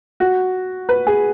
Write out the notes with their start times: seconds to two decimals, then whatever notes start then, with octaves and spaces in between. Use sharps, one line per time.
0.20 F#4
0.89 B4
1.07 G#4